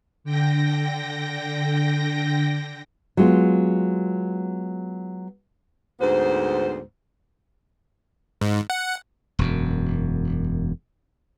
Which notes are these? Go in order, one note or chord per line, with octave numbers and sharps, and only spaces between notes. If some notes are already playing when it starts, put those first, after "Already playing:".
D3 G5 A#6
F#3 G#3 B3 F4
D2 G#2 B3 C5
G#2
F#5
E1 F#2